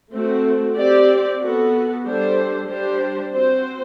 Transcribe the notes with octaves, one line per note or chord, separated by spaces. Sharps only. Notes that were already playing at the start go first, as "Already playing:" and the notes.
A3 C4 F#4
C4 G4 D5
B3 F#4 A4
G3 D4 A4 C5
G3 D4 G4 C5
C4 F#4 C5